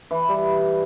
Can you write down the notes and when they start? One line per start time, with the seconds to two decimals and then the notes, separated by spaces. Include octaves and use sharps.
0.11 E3
0.29 G3